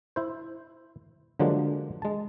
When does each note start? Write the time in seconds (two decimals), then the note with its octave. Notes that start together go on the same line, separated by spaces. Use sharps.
0.16 E4 C5
1.40 D3 F3 F#3 G#3 A#3 D4
2.02 G#3 A5